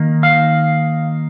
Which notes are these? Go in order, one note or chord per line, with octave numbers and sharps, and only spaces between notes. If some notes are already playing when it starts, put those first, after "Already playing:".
Already playing: D#3 A#3 D#4
F5